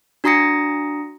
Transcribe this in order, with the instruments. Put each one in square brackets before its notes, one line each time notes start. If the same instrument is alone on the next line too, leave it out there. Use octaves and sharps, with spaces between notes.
[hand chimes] D4 F#4 A#5 D#6 A#6 C#7